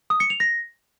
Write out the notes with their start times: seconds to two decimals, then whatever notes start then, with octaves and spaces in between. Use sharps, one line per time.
0.10 D#6
0.20 C#7
0.30 F7
0.40 A#6